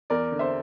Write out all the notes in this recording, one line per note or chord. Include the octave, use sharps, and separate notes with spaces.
E2 A#4 D5
D3
C5 E5